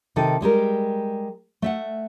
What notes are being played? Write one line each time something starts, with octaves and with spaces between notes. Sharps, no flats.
C3 D#3 D#4 A4
G3 G#3 G4 A#4
A3 E5 F#5